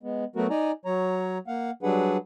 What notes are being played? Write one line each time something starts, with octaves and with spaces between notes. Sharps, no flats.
G#3 B3
F#3 A3 B3 F#4 A#4
D#4 D5 G#5 A#5
F#3 C#5 A#5
A#3 F5 F#5
F#3 G3 D4 G#4 B4 F#5